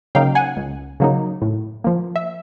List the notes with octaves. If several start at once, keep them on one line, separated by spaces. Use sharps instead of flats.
C#3 F#3 A#3 D#4 F5 G5
F#5 G#5
C#2
C#3 F#3 A#3 D#4
A2
F3 A#3
E5